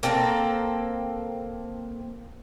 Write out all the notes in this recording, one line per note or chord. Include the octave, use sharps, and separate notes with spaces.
A#3 C4 A4 A#5